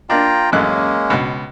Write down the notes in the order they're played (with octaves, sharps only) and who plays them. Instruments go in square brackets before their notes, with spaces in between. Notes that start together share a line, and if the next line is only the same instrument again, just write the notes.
[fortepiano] A#3 D4 [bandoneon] F4 G5 A#5
[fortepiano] A1 F#2 F#6 [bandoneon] G#3 A#3 C#4
[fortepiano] C#2 B2